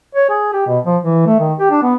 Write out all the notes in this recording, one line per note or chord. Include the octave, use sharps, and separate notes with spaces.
C#5
G#4
G4
B2
F3
E3
A3
D#3
G4
D4
B3